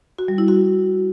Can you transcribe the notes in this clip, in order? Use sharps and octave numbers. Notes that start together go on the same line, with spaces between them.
F#4
G3
E4
F#4